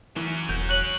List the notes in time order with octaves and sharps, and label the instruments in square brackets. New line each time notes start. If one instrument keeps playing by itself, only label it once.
[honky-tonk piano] E3 [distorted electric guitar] F#3 C#4
[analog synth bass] E1 [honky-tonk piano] G6
[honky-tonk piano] C#5 [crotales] F#6 F#7